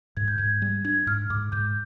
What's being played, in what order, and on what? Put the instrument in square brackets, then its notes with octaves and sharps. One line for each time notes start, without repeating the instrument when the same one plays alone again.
[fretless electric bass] G#2 [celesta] G#6
[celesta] G6
[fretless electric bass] G#2 [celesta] G#6
[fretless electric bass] G3
[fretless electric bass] D4 [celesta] G#6
[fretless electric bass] G#2 [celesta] F6
[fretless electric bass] G#2 [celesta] D6
[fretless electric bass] G#2 [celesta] G6